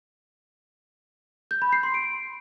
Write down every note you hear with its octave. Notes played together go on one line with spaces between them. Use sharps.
G6
B5
C7
C6
D7